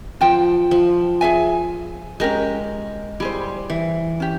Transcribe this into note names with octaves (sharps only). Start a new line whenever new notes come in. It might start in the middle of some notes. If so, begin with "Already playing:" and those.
F3 F4 C5 G5
F3
G#4 E5 G#5
G#3 C#4 G4 A#4
G3 E4 G#4 C5
E3
C#4 G4